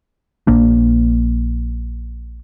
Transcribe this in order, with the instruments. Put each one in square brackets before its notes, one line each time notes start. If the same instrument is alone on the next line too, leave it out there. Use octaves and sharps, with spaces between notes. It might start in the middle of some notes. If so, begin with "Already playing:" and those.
[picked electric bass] A#1 A#2 A#3 D4